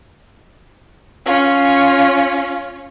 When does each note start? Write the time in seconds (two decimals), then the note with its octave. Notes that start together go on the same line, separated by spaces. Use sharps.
1.26 C#4 F4